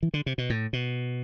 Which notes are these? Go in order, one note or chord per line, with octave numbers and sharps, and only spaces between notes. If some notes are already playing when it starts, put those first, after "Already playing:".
E3
D3
C3
B2
A2
B2